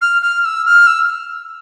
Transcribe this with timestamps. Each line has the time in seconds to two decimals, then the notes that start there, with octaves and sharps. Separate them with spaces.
0.02 F6
0.22 F6
0.45 E6
0.66 F6
0.87 E6